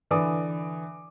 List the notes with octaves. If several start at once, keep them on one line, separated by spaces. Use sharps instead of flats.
D3 E3 D5 D6 D#6